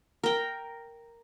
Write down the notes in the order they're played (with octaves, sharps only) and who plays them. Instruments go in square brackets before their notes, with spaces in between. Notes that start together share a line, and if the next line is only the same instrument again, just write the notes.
[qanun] A#4 G5